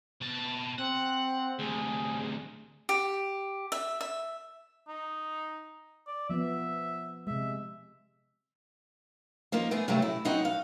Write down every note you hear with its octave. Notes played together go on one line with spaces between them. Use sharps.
B2 A5
C4 F#5
D2 C3 G#4
G4
E5
E5
D#4
D5
F3 B3 E5
C3 G#3 E5
F3 A#3 D#4 F4
A3 B3 G#4
G2 C3 F#3 A3
E4
F#3 C4 D#4 E4 F#4 F#5
F5